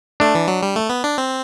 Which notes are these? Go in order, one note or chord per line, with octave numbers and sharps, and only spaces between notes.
A3 D4
E3
F#3
G3
A3
B3
D4
C4